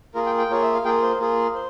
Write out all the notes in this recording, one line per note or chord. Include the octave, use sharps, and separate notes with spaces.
A#3 F4 G#4 A#4
G5
G5
A#3 F4 G#4 C#5
E5
F5
A#3 F4 G#4 G5
C5
A#3 F4 G#4
C5